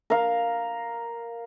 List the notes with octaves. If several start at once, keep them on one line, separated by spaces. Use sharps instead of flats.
A#4 F5